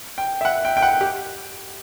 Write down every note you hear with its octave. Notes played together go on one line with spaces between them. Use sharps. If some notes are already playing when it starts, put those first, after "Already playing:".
G5
E5
F#5
G5
G5
F#5
G4